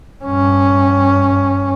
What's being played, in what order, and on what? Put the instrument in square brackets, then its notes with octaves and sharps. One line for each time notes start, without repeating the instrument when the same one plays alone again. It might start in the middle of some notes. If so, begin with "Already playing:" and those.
[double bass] G2 C#4